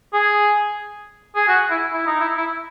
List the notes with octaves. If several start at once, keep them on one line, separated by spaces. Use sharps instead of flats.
G#4
G#4
F#4
E4
E4
D#4
E4
E4